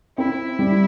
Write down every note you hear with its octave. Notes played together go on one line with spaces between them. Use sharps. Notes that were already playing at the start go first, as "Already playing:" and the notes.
C4 E4
G3